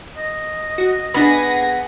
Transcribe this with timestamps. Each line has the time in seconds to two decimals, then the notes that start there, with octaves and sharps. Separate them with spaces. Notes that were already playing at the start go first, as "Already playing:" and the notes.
0.17 D#5
0.78 F#4
1.14 B3 D4 G#4 B5 A#6